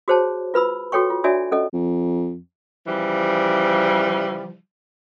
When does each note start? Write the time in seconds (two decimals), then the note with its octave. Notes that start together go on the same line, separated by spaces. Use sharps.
0.08 F#4 G#4 C5 C#5 A5
0.54 F4 B4 B5 E6
0.92 F#4 A4 C#5 G5 C#6
1.10 F4
1.24 D4 F#4 C#5 D5 E5 G#5
1.52 C#4 A4 D#5
1.73 F2
2.87 C#3 E3 F3 G3